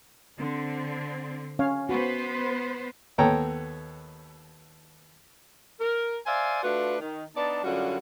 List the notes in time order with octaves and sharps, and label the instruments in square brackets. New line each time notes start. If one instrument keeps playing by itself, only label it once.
[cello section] D3 C4
[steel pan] C#4 C#5 F5
[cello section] B3 B4 C5 [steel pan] F#4
[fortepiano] D#2 B3 A4 C#5 G5 A#5
[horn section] A#4
C5 D5 E5 F5 G#5
A3 D4 F4 F#4 B4
D#3
B3 D4 D#4 D5 A5
F#2 D3 G3 C#4 F4 F#4